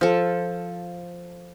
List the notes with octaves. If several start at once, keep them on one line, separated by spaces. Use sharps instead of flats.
F3 A4